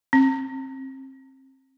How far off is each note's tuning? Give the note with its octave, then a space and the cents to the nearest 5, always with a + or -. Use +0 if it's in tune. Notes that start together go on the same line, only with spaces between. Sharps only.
C4 +30